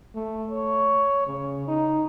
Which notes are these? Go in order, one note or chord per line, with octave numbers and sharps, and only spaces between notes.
A3
C#5
C#3
D#4